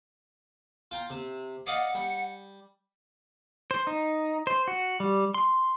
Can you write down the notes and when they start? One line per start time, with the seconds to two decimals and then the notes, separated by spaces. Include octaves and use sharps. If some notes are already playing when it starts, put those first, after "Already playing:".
0.91 F4 G5 A#5
1.10 C3
1.67 D5 D#5 F5 F#5
1.95 G3
3.71 C5
3.87 D#4
4.47 C5
4.68 F#4
5.00 G3
5.34 C6